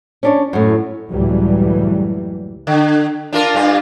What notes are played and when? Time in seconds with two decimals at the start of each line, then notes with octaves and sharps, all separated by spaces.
0.23 C#4 D4 C#5
0.53 F#2 A2
1.11 C#2 F#2 A2 E3 F#3 G3
2.67 D3
3.33 D4 F4 A#4
3.55 G2 F4